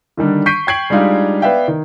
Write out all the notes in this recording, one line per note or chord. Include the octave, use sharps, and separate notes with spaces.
D3 D#3 G3 D4
C#6 G6 B6 C7 D7 D#7
G5 C#6 G#6 C7 D7 F#7
G3 G#3 D4 D#4 F4 G4
B3 B4 D5 E5 F5 G5
D#3